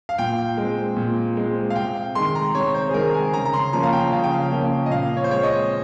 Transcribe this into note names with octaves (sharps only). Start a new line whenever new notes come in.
F5
A#2 G5
G#3 C4
A#2
G#3 C4
F5
C3 G5
D#3 G#3 C6
A#5
C3 C#5
C5
G#4
D#3 G#3 A#4
G#5
C#3 A#5
A#5
C6
F3 A#3 C#4 A#5
F5
G5
C#3 F5
G5
F5
F3 A#3 C#4
D#5
A#2 F5
C#5
C5
G#3 C4 C#5
D#5